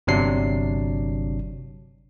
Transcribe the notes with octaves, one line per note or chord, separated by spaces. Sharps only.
G1 C3 F#3 D4 C7